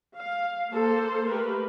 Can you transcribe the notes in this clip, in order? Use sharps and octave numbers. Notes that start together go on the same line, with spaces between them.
F5
A#3 A4 C5
A3 G4 A#4 B4